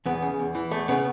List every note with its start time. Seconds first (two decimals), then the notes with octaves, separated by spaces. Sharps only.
0.06 E2 B3
0.22 C#3
0.39 E2
0.55 E3
0.71 E2 A3
0.88 C#3 B3